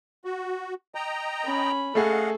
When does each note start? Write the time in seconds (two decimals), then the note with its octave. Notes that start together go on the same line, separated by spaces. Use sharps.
0.25 F#4
0.95 D#5 G5 A#5
1.44 C#4 B5
1.95 A3 G#4 A4 D#5 F5 F#5